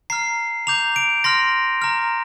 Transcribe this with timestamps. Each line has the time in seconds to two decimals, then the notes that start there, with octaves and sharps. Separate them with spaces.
0.10 A#5 F6 C7
0.67 A#5 D6 G6 F7
0.96 D7
1.24 C6 F6 A#6
1.82 A#5 F6